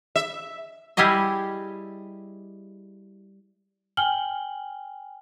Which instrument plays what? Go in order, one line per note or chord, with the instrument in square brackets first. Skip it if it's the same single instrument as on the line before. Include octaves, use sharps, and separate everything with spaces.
[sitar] E5
[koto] G3 E4 G4 G#4 D#5
[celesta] G5 G#5 F6 F#7 G7